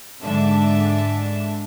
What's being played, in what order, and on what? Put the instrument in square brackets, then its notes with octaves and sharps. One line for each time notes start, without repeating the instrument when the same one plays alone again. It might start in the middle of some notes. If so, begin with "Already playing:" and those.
[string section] G#2 D3 D4 E5 A5